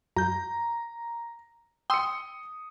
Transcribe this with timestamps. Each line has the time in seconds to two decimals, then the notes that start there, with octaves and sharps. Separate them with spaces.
0.16 F#2 A#5 G6
1.90 G5 C6 D#6 E6 C#7